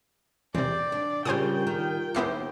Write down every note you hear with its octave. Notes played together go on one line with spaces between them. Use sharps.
E2 C3 C4 D5
D4
C#3 G3 F4 A#4 C5 G5 G#5 D#6
D#3
D#2 B3 E4 G4 C5 C7